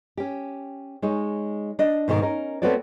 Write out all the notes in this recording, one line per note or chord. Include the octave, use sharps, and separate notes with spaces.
C#4 G4
G#3 D#4 C#5
D4 D#5
G#2 B2 D#3 G4 A#4
C#4 D#4 A#4
A3 B3 C4 F#4 C#5 D5